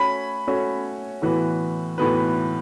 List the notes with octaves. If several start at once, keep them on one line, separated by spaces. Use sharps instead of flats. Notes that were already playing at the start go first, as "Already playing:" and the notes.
Already playing: A3 C#4 F#4 C#5 B5
A3 C#4 F#4 C#5
A2 E3 B3 F#4 B4
A2 E3 B3 F#4 B4